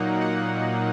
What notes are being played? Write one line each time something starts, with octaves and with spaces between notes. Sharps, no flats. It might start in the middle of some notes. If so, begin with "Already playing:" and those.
Already playing: A#2 F#3 A#3 D#4 F#5
F#5